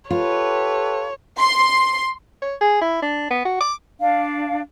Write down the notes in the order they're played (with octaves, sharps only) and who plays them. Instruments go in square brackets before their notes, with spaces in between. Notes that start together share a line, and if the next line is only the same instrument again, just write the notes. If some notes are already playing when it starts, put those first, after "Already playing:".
[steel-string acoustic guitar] F4 [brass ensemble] G4 A4 B4 [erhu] C#5
[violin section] C6
[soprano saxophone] C#5
G#4
E4
D4
B3
F#4
D6
[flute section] D4 F5